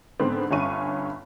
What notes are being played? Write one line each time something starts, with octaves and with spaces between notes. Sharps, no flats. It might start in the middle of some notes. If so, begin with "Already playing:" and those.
G#2 D3 B3 C4
G1 G2 C#4 C#6 D#7